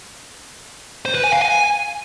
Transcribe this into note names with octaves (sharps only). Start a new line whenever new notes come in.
C5
B4
G#5
F5
G#5